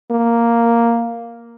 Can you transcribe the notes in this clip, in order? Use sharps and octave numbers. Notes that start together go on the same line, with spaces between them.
A#3